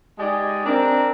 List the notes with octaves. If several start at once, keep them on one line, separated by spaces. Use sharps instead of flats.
G#3 D#4 G4 D5 D#5 G#5
C4 D4 A#4